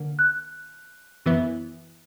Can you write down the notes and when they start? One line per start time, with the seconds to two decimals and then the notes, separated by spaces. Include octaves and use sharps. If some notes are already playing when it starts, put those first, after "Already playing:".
Already playing: D3 A#3
0.19 F#6
1.26 F#2 E3 B3 E4